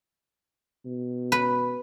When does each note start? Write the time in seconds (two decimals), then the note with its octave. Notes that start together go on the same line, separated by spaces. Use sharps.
0.86 B2
1.32 B4